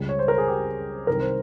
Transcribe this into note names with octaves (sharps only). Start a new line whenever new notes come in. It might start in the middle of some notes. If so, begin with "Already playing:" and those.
Already playing: C#2 C#3 G3
C#5
C5
A#4
G#4
G4
C2 C3 D#3 G3 A#4
C5